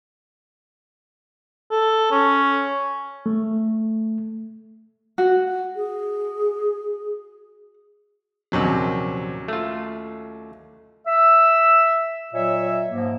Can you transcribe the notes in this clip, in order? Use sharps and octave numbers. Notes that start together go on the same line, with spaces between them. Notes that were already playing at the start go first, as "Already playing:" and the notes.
A4
C#4
A3
F#4
G#4
A#1 D#2 C3 F#3 C4 C#4
A3 F4
E5 E6
A#2 F#3 C#5 D#5 E5
G#2 F3 A#3